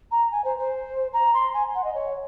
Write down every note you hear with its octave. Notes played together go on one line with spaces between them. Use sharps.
A#5
G#5
C5
C5
A#5
C6
G#5
F#5
D#5
C#5